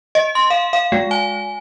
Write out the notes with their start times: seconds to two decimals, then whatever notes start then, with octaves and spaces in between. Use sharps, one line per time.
0.15 D#5
0.35 C6
0.50 F5
0.73 F5
0.92 G#3
1.11 G#5